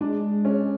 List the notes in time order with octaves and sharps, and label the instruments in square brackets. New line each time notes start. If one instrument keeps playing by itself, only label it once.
[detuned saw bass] G#3 [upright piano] D4
[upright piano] C#4